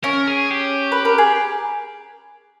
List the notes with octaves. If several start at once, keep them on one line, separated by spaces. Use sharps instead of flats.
C#4 A#4
G#4
G4
B4
A#4
G#4